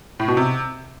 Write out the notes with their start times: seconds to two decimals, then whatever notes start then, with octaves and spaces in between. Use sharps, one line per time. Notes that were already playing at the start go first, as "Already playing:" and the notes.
0.20 A2
0.28 B2
0.37 C3